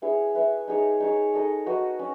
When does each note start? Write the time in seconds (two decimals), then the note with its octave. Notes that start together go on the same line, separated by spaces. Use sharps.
0.02 B3 E4 G#4 C#5
0.35 E4 B4 E5
0.68 D#4 G#4 C#5
1.00 D#4 G#4 C#5
1.34 D#4 A4 D#5
1.66 D#4 F#4 B4 D#5
1.99 C#4